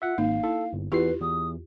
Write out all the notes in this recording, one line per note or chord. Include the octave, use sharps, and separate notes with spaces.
F4 E5 F#5
G#1 A#3 D#4 F5
E4 A4
G1
E2 E4 F4 G4 B4 C7
E2 D#6